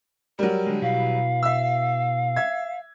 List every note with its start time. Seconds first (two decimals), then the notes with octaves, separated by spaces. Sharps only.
0.39 F#3 G3 A#4
0.67 D3 G#3
0.82 B2 E4 F#4 F5
1.43 E5 E6
2.36 E5 G#6